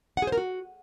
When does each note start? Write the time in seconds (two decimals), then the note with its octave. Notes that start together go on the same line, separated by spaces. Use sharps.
0.17 F#5
0.22 G#4
0.27 C5
0.32 A#4
0.37 F#4